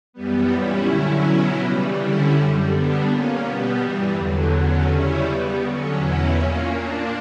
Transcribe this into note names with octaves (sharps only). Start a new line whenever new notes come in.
F#2 E3 G3 B3
A#2 G3 C#4 E4
D3 F#3 C#4 E4
B2 F#3 C#4 E4
C#3 E3 G3
D3 G3 C#4 E4
F#2 D3 G3
D3 G3 B3 D4
A#2 A#3 C#4
B2 G3 B3
G2 E3 G3
E2 D3 F#3
E2 D3 F#3 C#4
C#3 G3 C#4 E4
C#3 G3 B3
D3 F#3 C#4
E2 B2 F#3 C#4 E4
A#2 A#3 C#4
A#2 A#3 D4